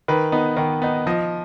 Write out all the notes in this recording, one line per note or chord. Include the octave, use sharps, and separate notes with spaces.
D#3 B4
B3 D#4
D#3
B3 D#4
F3 D#5